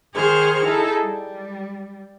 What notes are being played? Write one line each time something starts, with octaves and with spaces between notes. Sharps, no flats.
D#3 G#4 C5 C#6 F6
D#4 E4 G#4 A4
G3